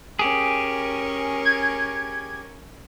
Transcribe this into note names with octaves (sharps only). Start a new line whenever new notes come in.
C#4 G4 G#4 A#4
G#6